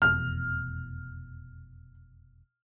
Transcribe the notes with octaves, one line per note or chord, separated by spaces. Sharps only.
F1 E2 B2 F6